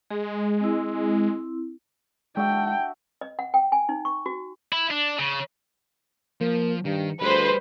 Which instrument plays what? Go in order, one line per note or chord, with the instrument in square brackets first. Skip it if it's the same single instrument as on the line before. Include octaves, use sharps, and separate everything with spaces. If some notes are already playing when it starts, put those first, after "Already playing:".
[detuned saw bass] G#3 [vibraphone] G#4
[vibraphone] C4 E4
[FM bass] G#3 [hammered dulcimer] D4 F#4 E5 [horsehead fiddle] G5
[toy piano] D#5
F#5
G5
G#5
D#4
C#6
F#4
[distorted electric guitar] E4
D4
C#3
[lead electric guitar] F3 [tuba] A#3
[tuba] G2 [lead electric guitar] D#3
[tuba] D2 [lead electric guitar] G3 G#4 [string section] B4 C5